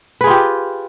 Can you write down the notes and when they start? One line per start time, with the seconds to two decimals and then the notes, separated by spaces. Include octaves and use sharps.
0.21 B4
0.24 G#4
0.27 F4
0.30 G4